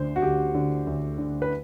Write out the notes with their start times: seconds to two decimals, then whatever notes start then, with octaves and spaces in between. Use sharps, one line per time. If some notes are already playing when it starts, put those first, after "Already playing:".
Already playing: D2 D3 C5
0.16 F#4
0.22 D2 G4
0.55 D3
0.87 D2
1.18 D3
1.42 B4